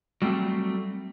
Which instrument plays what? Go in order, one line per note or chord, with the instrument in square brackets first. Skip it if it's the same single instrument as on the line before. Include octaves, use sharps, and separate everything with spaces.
[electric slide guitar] F#3 G3 A3 C4